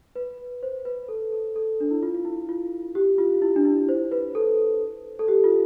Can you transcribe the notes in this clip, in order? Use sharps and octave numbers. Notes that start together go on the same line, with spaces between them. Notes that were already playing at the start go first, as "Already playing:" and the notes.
B4
C5
B4
A4
A4
A4
D4
E4
F4
F4
E4
F4
G4
F4
E4
D4
E4
C5
B4
A4
A4
G4
F4